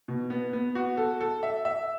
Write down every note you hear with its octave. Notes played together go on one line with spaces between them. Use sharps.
B2
B3
B3
F#4
A4
A4
E5
E5